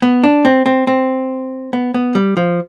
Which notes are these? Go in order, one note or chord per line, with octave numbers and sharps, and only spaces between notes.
B3
D4
C4
C4
C4
B3
B3
G3
F3